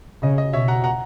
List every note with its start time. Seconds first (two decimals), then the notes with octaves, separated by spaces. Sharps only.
0.22 C#3 D#5
0.38 D#5
0.53 B2 C#5 E5
0.68 F#5 A#5
0.84 F#5 A#5